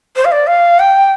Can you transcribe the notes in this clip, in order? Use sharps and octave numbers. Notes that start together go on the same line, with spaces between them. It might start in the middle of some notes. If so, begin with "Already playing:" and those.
C5
F5
D5
F5
G5